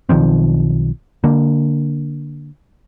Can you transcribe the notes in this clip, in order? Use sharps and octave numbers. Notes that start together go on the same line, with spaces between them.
B1 D#3 F3 C4
D3 A#3